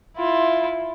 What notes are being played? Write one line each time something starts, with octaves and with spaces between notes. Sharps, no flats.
E4 F4